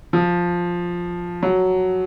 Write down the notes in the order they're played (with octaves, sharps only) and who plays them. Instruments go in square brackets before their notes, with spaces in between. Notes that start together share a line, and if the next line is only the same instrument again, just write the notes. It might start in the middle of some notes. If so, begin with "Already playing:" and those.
[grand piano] F3
F#3